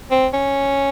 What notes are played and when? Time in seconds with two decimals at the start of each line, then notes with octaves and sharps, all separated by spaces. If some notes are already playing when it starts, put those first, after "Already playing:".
0.11 C4
0.34 C#4